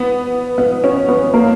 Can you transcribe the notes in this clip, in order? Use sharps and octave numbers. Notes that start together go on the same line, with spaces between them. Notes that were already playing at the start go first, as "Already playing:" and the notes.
Already playing: B3
B3
C#4
B3
A#3